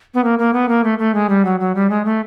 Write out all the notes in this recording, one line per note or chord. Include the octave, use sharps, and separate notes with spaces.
B3
A#3
A#3
B3
A#3
A3
A3
G#3
G3
F#3
F#3
G3
G#3
A3